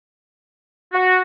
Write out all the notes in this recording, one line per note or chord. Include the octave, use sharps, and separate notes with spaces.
F#4